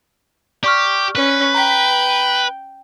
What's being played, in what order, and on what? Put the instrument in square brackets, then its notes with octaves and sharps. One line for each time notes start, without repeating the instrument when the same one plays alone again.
[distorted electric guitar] G4 [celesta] D5 C#6 F6
[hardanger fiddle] C#4 [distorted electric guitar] B4
[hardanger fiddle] G5 [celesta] A#5 B6